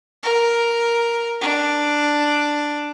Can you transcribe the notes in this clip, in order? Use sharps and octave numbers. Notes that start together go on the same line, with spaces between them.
A#4
D4